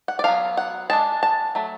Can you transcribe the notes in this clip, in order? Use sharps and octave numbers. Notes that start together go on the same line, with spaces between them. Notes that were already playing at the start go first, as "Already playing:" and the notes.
F#5
D5
F#3 B3 D4 F5
F#5
G#3 D4 A5
A5
F#3 A3